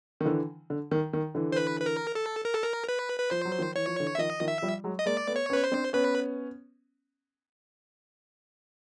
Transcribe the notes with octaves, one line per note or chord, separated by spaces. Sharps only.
D#3
D3 E3
D3
D#3
D#3
D3 E3
C5
B4
B4
A#4
A4
A#4
A4
A#4
B4
B4
F3 C5
F#3
D#3 F3
E3 C#5
F3
D3 E3
E5
D#3 F3 D#5
D#3 F3
E5
F3 G3
F#3 G#3
D#5
G#3 A#3 D5
A3 B3
C#5
B3 C#4
B4
C5
C4 D4
B3 C#4 B4